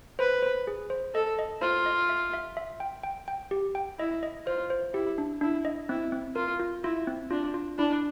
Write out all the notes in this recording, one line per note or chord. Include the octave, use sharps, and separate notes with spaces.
B4 C5
C5
G#4
C5
A4 D#5
D#5
F4 C5
D#5
E5
E5
E5
G5
G5
G5
G4
G5
E4 D#5
D#5
F4 C5
C5
E4 G4
D4
D4 E4
D#5
C4 E4
C4
F4 A#4
F4
E4 F4
C4
D4 F4
F4
D4 E4